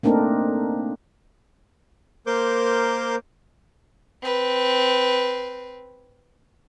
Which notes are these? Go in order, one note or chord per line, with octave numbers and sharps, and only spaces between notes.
A3 A#3 C4 D4 D#4 A#4
A#3 A#4 C5 C6 D6 G6
C4 B4